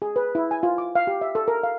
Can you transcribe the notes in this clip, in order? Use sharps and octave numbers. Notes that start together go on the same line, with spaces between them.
G#4
B4
E4
G#5
F4
D6
F5
G4
E5
A4
A#4
F5